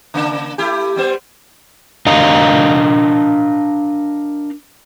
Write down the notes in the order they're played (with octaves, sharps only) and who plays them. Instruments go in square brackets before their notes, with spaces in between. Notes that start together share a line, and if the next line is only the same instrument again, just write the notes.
[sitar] C#3 A#3 D4
A3 E4 G4
G3 B3 C5
[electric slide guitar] D4 A#4 D#5 F5 A#5